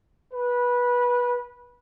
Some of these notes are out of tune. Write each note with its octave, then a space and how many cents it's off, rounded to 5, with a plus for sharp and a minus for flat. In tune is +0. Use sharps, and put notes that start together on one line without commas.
B4 -20